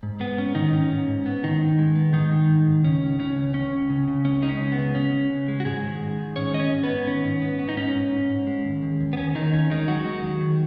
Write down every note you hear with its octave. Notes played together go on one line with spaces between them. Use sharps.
G#2
G#3 B3
G#2 C#4
G#2 D#3 D#4
G#2 C#4
G#2
G#2
B3
G#2 D#3 D#4
G#2
G#3
B3
G#2 D#3 D#4
G#3
G#2
G#2
C#2 C#4
C#2
C#3 C#4
C#2
C#2 C#4
C#2
C#3
C#3
C#2 C#4
G#3 D#4
C#4
C#2
B3
C#3
C#3 C#4
C#3
C#3
G#3
F#4
G#2 G#3 G#4
D#3
G#2
D#3
G#2 C#4 C#5
D#3 D#5
C#4 C#5
G#2
G#2 B3 B4
D#3 C#4
G#2
B3
B3
D#4
G#2 C#4
G#2
G#2
G#2
G#3
D#2
D#2
D#2
B3
D#2 C#4
D#2 D#3 D#4
D#2 C#4
D#3 G#3 D#4
F#3 G#3 F#4
G#3
D#2
D#3